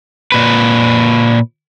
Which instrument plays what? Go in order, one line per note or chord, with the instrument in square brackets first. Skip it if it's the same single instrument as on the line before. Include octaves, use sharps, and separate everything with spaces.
[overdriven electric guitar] A#2 B4